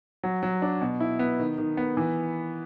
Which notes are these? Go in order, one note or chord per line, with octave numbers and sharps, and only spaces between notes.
F#3
F#3
D4
B2
E4
B3
D#3
D#3
B3
E3